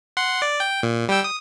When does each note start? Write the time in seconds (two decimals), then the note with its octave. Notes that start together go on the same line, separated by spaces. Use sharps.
0.17 F#5 C6
0.42 D5
0.60 G5
0.83 A#2
1.09 G3 G5 E6
1.24 D#6